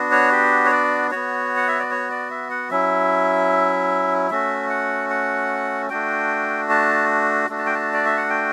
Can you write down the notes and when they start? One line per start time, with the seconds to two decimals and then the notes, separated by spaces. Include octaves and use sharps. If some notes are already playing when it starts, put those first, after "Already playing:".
Already playing: B3 D4 F#4
0.11 C#5
0.31 G4
0.65 C#5
0.71 D5
1.11 B3 F#4 C#5
1.56 F#5
1.68 E5
1.79 D5
1.91 C#5
2.11 D5
2.30 E5
2.50 F#5
2.70 F#3 C#4 E4 E5
4.30 A3 C#4 F#4 E5
4.70 F#5
5.10 F#5
5.90 A3 D4 F#4 G5
6.70 A5
7.49 A3 D4 F#4
7.58 A5
7.66 G5
7.75 A5
7.93 D5
8.05 E5
8.17 F#5
8.29 G5